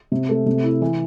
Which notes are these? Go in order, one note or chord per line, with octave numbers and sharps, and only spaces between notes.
C3
A3
C3
E4
E3